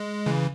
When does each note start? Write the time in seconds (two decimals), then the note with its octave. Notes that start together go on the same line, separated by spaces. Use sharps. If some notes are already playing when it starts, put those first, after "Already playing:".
Already playing: G#3
0.26 C#3 E3